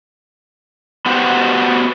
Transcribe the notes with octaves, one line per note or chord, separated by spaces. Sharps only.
B3 F#4 G4 C5 F5 F#5